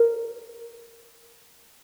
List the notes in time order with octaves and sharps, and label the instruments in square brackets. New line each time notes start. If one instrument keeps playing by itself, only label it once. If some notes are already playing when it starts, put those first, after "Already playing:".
Already playing: [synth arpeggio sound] A#4